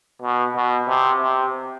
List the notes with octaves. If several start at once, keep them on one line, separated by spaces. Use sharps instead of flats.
B2
B2
C3
C3